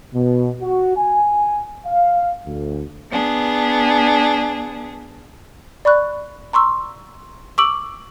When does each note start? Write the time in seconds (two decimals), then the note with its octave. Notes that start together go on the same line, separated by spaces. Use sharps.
0.14 B2
0.62 F#4
0.96 G#5
1.86 F5
2.46 D2
3.11 B3 D4 G#4
5.85 D5 B5 C#6 F#6
6.53 A#5 C6 C#6 E6
7.58 C#6 D6 E6 D7 F#7